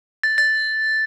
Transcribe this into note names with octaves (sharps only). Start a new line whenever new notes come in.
A6
A6